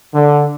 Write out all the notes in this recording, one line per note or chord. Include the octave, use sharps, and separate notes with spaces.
D3